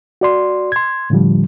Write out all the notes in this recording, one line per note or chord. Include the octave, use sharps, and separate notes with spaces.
F#4 D5 C6
C6 G#6
A2 D3 F3 G3